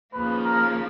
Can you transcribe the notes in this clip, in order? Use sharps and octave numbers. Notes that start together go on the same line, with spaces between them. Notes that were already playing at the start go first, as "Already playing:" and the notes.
D#2 C#3 F3 A#3 B4
A#4